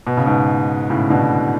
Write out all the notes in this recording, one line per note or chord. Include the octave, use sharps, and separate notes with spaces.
B2
C#3
G#2 B2
A2 C#3
B2 D3